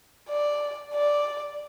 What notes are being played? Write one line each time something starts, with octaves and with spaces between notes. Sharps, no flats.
D5
D5